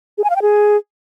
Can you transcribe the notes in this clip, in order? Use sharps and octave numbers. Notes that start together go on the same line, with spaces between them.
G#4
G#5
F5
G5
G#4